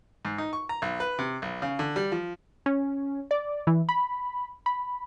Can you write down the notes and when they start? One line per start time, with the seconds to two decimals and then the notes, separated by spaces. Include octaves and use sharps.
0.25 G#2
0.38 D#4
0.53 C#6
0.69 A#5
0.82 B1
1.00 B4
1.19 C3
1.42 B1
1.62 C#3
1.79 D3
1.96 G3
2.12 F3
2.66 C#4
3.31 D5
3.67 E3
3.89 B5
4.66 B5